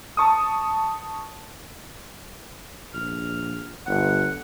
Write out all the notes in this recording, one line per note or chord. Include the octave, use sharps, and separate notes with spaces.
A5 C#6 D#6
A#1 F6
G1 F#5